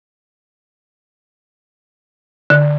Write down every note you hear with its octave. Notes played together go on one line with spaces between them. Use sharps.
D3